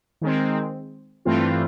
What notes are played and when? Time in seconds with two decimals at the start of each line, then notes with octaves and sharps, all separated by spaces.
0.21 D#3 G#3 C4
1.25 G2 E3 A3 C4 F4